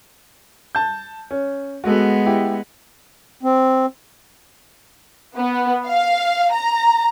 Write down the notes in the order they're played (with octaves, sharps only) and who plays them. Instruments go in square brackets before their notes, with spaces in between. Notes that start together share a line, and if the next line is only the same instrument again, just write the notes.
[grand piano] A5 G6
C#4
[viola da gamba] G#3 B3 [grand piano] F#4 A4
[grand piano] E4 G4
[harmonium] C4
[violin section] B3
F5
A#5